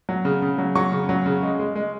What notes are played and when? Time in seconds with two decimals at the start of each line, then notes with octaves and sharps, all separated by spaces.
0.09 F#3
0.25 C#3
0.42 C#3
0.58 F#3
0.75 F#3 C#6
0.92 C#3
1.09 F#3
1.26 C#3
1.43 G#3
1.59 G#3
1.75 G#3